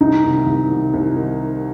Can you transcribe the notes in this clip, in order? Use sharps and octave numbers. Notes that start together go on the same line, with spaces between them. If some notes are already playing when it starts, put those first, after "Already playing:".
C2 D#4
C3 D#3
C2
C3 D#3
C2
D#3